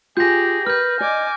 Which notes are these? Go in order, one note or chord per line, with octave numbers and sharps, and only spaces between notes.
F4 G4 G#4 G#5 G6 A#6
A#4 B4 F6 G6
D5 D#5 G#5 D6